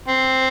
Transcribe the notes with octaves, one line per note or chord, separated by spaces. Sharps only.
C4